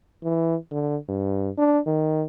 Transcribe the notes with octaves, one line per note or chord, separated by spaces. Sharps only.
E3
D3
G2
D4
D#3